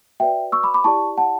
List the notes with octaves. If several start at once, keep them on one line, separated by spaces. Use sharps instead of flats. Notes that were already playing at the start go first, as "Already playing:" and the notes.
F#4 B4 D5 E5 G5
C#6 E6
B5 D6
B5 D6
E4 G4 D5 A5 C#6
F#5 A5